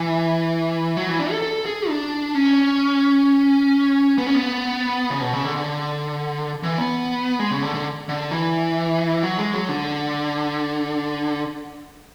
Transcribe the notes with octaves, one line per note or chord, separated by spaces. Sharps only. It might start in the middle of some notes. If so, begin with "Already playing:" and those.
Already playing: E3
F#3
E3
D4
A4
A4
G#4
D4
C#4
B3
C#4
B3
C#3
B2
C#3
D3
D3
E3
B3
G#3
C#3
D3
D3
D3
E3
F#3
G#3
F#3
D3